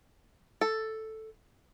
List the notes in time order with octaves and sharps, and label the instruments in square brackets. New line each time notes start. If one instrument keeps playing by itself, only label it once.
[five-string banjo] A4